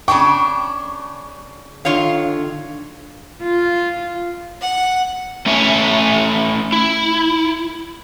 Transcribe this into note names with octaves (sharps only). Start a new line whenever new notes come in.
C#3 D4 G5 C#6
D3 D#3 F4 C#5 F5
F4
F#5
A3 C#4 E4 C#5 E5 G#5
E4